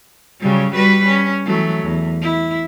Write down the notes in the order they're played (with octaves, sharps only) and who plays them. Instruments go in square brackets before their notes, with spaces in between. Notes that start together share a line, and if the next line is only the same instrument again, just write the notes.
[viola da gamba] C#3 F#3 G3
G3 F#4 B4
C#4
E3 F#3 A3
E2
E4